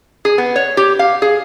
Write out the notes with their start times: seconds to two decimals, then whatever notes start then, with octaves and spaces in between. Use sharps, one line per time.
0.25 G#4
0.38 B3
0.56 C#5
0.77 G4
0.99 F5
1.22 G#4